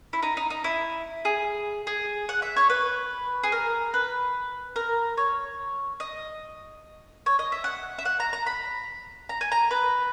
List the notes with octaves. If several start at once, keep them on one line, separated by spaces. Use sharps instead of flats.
E4
D#4
D#4
D#4
E4
G#4
G#4
F#5
E5
C#5
B4
G#4
A#4
B4
A#4
C#5
D#5
C#5
D#5
E5
F#5
E5
F#5
A#5
A#5
B5
A#5
G#5
A#5
B4